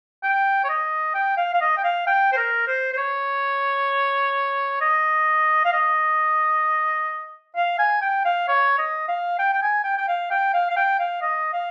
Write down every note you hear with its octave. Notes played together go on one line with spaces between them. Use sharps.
G5
C#5
D#5
G5
F5
F5
D#5
G5
F5
G5
C5
A#4
C5
C5
C#5
D#5
F5
D#5
F5
G#5
G5
F5
C#5
D#5
F5
G5
G5
G#5
G5
G5
F5
G5
F5
F5
G5
F5
D#5
F5